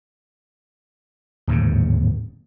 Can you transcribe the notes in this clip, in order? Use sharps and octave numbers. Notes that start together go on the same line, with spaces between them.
D1 D#2 G#2 C#3